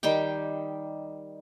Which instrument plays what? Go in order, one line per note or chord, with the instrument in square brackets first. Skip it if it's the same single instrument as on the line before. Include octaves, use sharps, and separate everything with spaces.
[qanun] D#3 G3 G4 G5